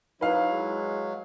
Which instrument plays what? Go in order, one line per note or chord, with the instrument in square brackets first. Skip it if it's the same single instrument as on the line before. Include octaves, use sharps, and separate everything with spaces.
[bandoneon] F#3 [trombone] D#4 [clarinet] E4 [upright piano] B4 F5
[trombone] G#3